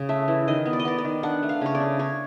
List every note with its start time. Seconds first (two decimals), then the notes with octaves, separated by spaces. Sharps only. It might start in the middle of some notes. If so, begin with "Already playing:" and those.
Already playing: C#3
0.09 A3 E5
0.28 E3
0.48 D#3 D#5
0.66 B3
0.73 D5
0.79 D#5
0.85 B3 D5
0.98 D5
1.05 D#3
1.23 D4 F#5
1.43 A3
1.49 F5
1.61 C#3 C#5
1.75 D5
1.80 D4
1.99 D4 C#5